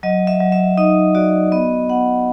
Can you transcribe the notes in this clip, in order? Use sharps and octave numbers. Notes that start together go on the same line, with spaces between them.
F#3 D#5
E5
F#3
E5
D#4 D#5
F#4 D5
B3 D#5
B3 F#5